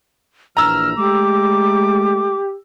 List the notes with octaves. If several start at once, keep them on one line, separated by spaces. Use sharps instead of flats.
A#1 E3 D4 A#5 E6 F6
G#3 A3 G4 D6